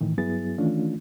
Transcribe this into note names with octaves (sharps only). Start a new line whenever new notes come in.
A2 D#3 E3
G2 F#3 B3 E4 G#4 A6
D#3 E3 A3 C#4 D4 F4